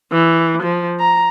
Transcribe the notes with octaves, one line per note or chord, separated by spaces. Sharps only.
E3
F3
A#5